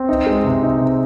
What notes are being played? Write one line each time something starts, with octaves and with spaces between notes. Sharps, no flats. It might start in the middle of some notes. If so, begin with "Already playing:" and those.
Already playing: C4
D#4
G#3
C3
D#4
C3